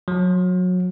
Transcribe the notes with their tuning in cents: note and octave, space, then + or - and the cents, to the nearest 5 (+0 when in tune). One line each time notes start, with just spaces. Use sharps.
F#3 -25